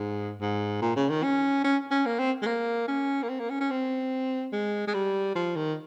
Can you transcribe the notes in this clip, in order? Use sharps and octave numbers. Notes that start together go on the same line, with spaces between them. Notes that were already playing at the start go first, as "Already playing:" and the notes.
Already playing: G#2
G#2
A#2
C#3
D#3
C#4
C#4
C#4
A#3
C4
G#3
A#3
C#4
A#3
C4
A#3
C#4
C#4
C4
G#3
G#3
G3
F3
D#3